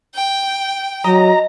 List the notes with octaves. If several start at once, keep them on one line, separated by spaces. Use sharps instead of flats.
G5
F#3 D#5 A#5